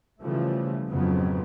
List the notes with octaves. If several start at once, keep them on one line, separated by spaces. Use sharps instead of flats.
C#3 E3 F3 G3 A3
F2 G#2 C#3 F3 F#3 B3